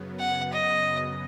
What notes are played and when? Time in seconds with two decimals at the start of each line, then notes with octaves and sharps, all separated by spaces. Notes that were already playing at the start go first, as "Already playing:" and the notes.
Already playing: F#2 C#3 F#3 B3
0.19 F#5
0.52 D#5